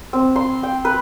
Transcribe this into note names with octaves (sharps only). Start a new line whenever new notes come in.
C4
C6
G5
B4